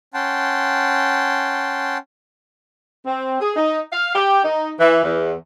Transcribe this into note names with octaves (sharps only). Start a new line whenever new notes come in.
C#4 F#5 G5 A5 C6
C4
G#4
D#4
F5
G4
D#4
E3
E2